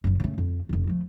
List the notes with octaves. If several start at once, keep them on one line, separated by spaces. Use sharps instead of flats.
F#1 F#2
C#3 A3
F2
F1 E2
F3 A3